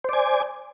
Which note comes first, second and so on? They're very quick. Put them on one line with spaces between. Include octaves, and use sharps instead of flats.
C5 D5 G#5